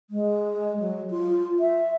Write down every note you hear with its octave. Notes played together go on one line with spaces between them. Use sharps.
G#3
F#3
F4
E5